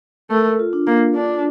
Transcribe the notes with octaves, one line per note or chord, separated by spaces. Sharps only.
A3 A#4
A4
F4
D4
A#3 D4
D4